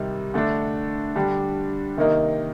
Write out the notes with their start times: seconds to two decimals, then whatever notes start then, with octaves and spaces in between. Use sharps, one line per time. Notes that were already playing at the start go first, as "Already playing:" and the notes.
Already playing: C3 D#3 G3
0.34 D3 A3 D4
1.16 D3 G3 D4 G4
1.97 C3 D#3 A#3 D#4